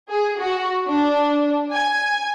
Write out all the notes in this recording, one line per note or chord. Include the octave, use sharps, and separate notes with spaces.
G#4
F#4
D4
G#5